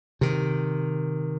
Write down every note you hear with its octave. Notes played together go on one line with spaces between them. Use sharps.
C3 D#3